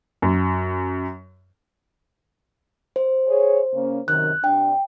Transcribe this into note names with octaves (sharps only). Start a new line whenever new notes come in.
F#2
C5
G#4 C#5
C#3 A#3 C#4
F#2 C3 D#3 F#6
C3 D4 G5